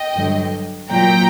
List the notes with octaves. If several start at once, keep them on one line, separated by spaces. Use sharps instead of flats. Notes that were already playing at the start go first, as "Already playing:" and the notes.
Already playing: D#5 G5
G2 D3 F#3
A#2 F#3 G5 A#5